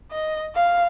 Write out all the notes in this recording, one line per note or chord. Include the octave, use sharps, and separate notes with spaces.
D#5
F5